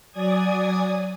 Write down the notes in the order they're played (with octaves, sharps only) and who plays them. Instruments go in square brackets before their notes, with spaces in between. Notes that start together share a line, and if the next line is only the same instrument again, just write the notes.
[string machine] F#3 D5 G#5 D#6 G#6